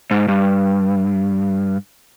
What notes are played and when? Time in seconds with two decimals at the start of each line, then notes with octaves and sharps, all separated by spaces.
0.11 G#2
0.28 G2